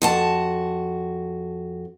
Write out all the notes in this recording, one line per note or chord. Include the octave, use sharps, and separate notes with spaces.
F2 F#4 A5